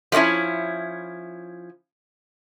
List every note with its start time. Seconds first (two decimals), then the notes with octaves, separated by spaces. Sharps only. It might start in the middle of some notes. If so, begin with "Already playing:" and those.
0.12 F3 G#3 A3 C#4 E4